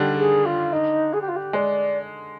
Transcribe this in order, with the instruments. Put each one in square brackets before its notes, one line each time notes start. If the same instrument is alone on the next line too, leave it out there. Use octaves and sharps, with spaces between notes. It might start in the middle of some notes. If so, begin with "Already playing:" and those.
Already playing: [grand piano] D3 D#3 G3
[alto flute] G#4
F4
D#4
G#4
G4
F4
G4
[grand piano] G#3 [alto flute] D5